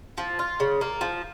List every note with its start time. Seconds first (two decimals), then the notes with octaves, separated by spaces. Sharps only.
0.18 F3
0.39 F4
0.60 C#3
0.81 A#3
1.01 F3